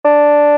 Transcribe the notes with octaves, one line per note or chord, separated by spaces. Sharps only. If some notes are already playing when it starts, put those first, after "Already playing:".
D4